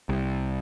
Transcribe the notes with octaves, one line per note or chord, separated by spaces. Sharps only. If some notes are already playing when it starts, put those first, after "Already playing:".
C2